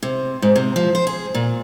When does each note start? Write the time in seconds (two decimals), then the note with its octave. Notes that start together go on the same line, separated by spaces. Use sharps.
0.03 C3
0.42 G#2
0.56 C3
0.76 F3
0.95 C5
1.07 G#4
1.35 A#2